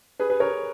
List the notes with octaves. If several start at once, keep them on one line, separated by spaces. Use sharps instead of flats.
G#4 B4
G#4 B4
A#4 C#5